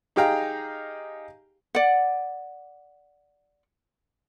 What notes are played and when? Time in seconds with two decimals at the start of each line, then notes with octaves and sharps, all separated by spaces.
0.16 D#4 G4 G#4 F5 G5 A#5
1.75 D5 F#5